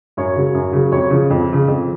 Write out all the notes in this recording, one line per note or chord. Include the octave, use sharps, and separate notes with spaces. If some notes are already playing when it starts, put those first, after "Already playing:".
F#2 C#5
C#3 F#3
F#2
C#3 F#3
F2 C#5
C#3 F3
F2
C#3 F3
F2